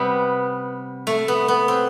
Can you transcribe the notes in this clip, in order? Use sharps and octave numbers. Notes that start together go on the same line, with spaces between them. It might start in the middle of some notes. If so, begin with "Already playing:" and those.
Already playing: C3 G3 B3
A3
B3
B3
C4